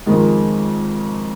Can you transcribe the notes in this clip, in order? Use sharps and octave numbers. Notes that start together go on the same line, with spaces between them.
F2 D#3 G#3